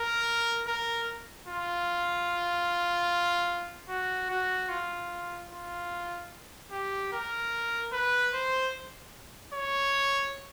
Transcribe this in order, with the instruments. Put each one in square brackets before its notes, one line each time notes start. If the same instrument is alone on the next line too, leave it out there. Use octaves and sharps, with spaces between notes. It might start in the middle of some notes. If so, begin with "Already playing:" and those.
Already playing: [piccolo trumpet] A#4
A#4
F4
F#4
F#4
F4
F4
G4
A#4
B4
C5
C#5